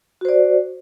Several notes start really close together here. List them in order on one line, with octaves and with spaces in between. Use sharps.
F#4 C5 D5